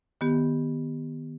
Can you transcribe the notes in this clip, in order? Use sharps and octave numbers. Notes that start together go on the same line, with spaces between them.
D#3 B3 G4